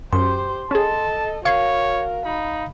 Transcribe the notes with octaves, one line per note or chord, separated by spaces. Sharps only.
F#2 G4 C5 C6
C#4 G#4 A4 D#5 A5
F#4 A#4 C#5 F5 C#6 G#6 C7
D#4 B5